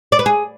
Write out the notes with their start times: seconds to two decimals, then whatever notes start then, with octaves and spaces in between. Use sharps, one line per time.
0.12 D5
0.19 B4
0.26 G#4